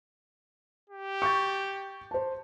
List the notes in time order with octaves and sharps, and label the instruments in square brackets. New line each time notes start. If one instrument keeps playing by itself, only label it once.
[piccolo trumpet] G4
[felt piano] C#6 G6 A6
C5 A5